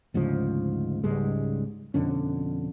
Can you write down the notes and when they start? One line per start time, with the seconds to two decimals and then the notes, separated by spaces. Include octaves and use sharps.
0.14 D2 G#2 C#3 F3
1.04 C#2 G#2 G3 G#3
1.94 F2 B2 D3 C#4